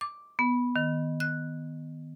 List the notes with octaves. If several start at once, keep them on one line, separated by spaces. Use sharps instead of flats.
D6
B3
D#3
F#6